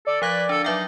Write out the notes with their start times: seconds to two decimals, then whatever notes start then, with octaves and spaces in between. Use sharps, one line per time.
0.07 A4 D5
0.22 F3 B4 F5 G#6
0.49 D4 A4
0.64 F#3 D#4 E5 G5